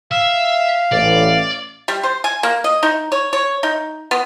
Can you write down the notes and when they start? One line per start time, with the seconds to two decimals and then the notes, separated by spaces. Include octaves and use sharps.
0.11 E5 F5
0.92 A1 D5
1.88 G3
2.03 C5
2.24 G#5
2.43 A#3
2.64 D#5
2.83 D#4
3.12 C#5
3.33 C#5
3.63 D#4
4.11 B3